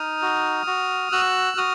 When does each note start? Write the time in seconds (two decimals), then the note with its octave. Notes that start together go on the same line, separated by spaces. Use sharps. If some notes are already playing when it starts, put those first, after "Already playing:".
Already playing: D#4 D#6 F6
0.22 F#4
0.67 F#4
1.12 F#4 E6 F#6
1.57 F#4 D#6 F6